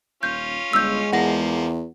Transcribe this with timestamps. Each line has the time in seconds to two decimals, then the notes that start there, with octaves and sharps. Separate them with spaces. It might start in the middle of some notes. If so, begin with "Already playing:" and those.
0.23 D#1 C#4 F4 G6
0.73 G1 G#3 E6 G6
1.12 E2 F3 A#3 F#5 A#6